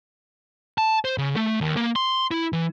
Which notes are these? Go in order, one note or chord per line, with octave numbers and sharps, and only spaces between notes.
A5
C5
C#3
A3
D#2
A#3
C6
E4
E3